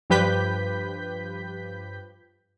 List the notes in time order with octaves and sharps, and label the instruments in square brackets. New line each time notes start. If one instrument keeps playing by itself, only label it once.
[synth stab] G2 F3 G4 B4 G6 B6